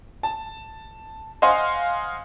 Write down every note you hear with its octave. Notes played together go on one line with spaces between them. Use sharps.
A5
C5 D#5 F5 F#5 G#5 C6